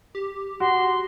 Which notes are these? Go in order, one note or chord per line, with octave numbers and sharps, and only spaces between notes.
G4
F#4 C6